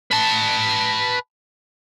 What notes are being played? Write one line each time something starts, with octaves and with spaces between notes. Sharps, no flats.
B4 A5